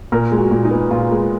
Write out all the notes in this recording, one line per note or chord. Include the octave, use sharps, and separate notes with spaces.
A#2 A#4
G#3
F#4
A#2
D#4
B3
A#2 F4
G#3